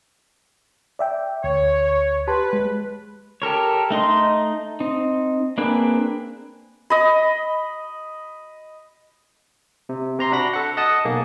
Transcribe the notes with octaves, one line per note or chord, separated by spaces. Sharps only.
D5 E5 G5
D2 C#5
G4 B4 A5 C6
G#3
G4 A4 A#4 C#5
A3 D#4 D#5 C6
C4 D#4
A#3 C4 D4 G#4 B4
D#5 B5
C3
C3 A#5 C6
D4 F#4 B5 A#6
A4 F#5
D#5 F#5 A5 D#6
B1 A#3 G#4